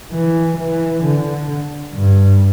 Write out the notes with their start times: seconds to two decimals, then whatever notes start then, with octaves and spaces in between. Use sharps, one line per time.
0.12 E3
0.57 E3
1.02 D3
1.93 G2